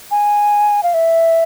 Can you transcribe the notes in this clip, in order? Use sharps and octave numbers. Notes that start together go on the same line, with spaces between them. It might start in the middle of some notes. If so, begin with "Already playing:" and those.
G#5
F5
E5